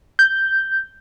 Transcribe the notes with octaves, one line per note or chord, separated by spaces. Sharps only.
G6